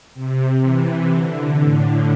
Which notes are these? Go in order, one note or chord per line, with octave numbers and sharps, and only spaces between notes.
C3
E3
D3
A2